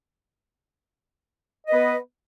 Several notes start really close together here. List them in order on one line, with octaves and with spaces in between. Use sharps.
D#5 B4 B3